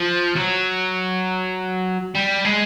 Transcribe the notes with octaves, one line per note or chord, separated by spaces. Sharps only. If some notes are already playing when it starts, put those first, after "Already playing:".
Already playing: F3
F#3
G3
G#3